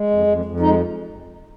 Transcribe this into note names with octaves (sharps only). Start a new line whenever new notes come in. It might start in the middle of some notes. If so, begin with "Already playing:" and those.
Already playing: G#3
F2
F2
F2
G#3 D#4